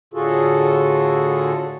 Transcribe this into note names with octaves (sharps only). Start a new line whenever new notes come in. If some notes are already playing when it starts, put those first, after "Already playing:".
A2 D3 F4 F#4 G#4 A4